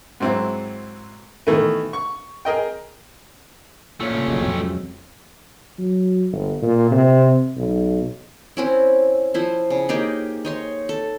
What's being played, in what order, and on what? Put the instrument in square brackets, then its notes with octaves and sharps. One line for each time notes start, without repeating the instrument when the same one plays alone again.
[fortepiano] G#2 F#3 C4 E4
B2 D#3 E3 A3
C#6
G#4 A#4 D#5 G5
[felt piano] A#1 F3 C#5 [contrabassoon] A#2 [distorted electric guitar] A3 C#4
[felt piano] G2 C#3
[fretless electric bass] C#3 F#3 [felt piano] C#5 D#5 F#5
[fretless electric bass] F2 F#3 [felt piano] B2 F4 G5
[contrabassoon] C#2
[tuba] F#3
G1
A#2
C3
B1
[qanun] C4 C#4 E4
F3 E4 C5
C#3
A#3 D#4 G4 G#4
D#4 C#5 C6
A4